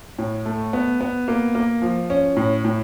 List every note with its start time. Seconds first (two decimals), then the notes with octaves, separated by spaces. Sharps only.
0.18 A2
0.46 A3
0.73 B3
1.01 B3
1.28 A#3
1.55 A#3
1.82 F3
2.10 C#4
2.37 A2
2.65 A2